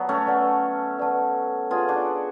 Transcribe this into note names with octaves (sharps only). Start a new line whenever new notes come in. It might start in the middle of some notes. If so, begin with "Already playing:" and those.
Already playing: F#3 B3 B4 D5 F#5 A5
A3 C#4
B4 D5 F#5 A5
B4 D5 F#5 A5
F4 G#4 B4 D5 F#5 A5
D4 F#4